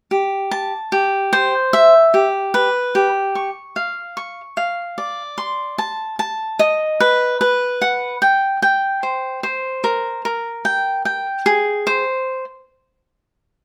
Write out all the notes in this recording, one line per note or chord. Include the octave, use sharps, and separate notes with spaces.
G4
A5
G4
C5
E5
G4
B4
G4
C#6
F5
C#6
F5
D5
C6
A5
A5
D#5
B4
B4
F#5
G5
G5
C5
C5
A#4
A#4
G5
G5
G#4
C5